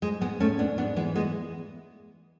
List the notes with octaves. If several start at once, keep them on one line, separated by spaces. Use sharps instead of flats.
G#2 G#3
G#2 G#3 B3
G#2 A3 C#4
G#2 B3 D4
G#2 B3 D4
E3 G#3 B3
G#3 B3